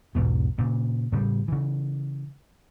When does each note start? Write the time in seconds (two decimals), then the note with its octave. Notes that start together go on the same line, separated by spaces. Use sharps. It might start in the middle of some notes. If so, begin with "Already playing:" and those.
0.15 B1 E2 G#2 B2
0.58 A#2 C#3
1.12 A2 C#3 G3
1.48 C#3 E3